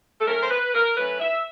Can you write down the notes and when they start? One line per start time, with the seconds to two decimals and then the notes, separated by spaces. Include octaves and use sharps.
0.20 A4
0.26 F#3 A3 C#4 A#4
0.40 C5
0.50 B4
0.73 A#4
0.96 F#3 A3 C#4 B4
1.19 E5